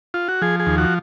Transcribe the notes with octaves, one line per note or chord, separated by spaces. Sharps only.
F4
F#4
F3 G#4
G#4
D#2
F#4